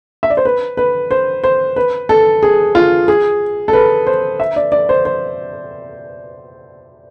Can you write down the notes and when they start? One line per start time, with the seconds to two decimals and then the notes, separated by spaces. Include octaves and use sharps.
0.23 E5
0.30 D5
0.37 C5
0.45 B4
0.77 B4
1.11 C5
1.44 C5
1.76 B4
2.09 A4
2.43 G#4
2.75 F4
3.08 G#4
3.68 A4
3.73 B4
4.07 C5
4.40 E5
4.56 D5
4.72 D5
4.89 C5
5.05 C5